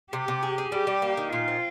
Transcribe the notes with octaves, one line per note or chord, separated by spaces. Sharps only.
C3 G4
C3
G#4
G#4
G3 G4
G3
A#3
D#3
A#2 F4
C4